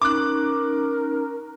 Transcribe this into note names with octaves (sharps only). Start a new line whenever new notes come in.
C#4 D#4 A#4 D6 F#6